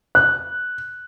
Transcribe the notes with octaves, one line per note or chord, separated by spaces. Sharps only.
F#6